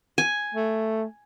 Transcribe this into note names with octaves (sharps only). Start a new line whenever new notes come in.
G#5
A3